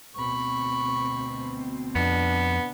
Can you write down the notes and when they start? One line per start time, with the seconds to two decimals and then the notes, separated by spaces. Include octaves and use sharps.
0.16 D2 B2 C4 B5 C#6
1.95 F2 B3 D4